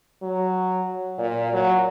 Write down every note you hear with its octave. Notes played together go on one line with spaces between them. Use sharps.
F#3
A#2
F#3